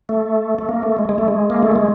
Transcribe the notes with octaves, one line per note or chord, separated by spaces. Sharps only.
A3
A3
A#3
A3
G#3
G#3
A3
G#3
A#3
A3
G#3